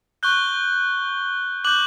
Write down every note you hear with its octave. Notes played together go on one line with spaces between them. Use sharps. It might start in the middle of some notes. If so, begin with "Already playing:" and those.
C#6 F#6 G6 G7
D6 F#6 G6 F#7